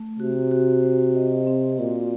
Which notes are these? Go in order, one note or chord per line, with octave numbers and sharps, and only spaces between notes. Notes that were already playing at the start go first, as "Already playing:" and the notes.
Already playing: A3
C3 F#4
F#4
C5
D#5
C4
A#2 F#4